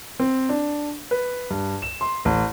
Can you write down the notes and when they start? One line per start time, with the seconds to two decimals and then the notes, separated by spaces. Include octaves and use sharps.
0.20 C4
0.49 D4
1.11 B4
1.50 G2
1.82 E7
2.01 C6
2.25 A1